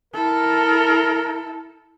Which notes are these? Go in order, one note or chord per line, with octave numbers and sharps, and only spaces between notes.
E4 A4 A#4